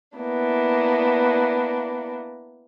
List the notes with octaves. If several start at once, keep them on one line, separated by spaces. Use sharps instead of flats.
A#3 B3 D4 E4